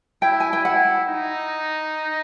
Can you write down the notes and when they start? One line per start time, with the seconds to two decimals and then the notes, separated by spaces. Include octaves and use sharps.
0.22 E4 G5
0.40 G#5
0.53 G5
0.65 E4 F#5
1.08 D#4